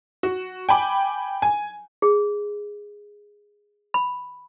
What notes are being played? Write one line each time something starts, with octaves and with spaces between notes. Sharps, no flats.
F#4
G5 G#5 B5 D6
G#5
G#4
B5